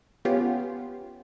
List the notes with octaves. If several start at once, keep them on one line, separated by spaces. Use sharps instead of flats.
B3 C#4 F4 G4